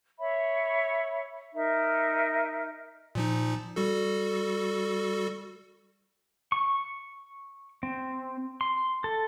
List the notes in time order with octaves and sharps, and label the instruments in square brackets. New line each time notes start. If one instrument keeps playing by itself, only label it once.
[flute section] C#5 E5 B5
D#4 A#4 E5
[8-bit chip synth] A#2 F3 D#4
G3 F#4 A4
[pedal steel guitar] C#6
C4
C6
A4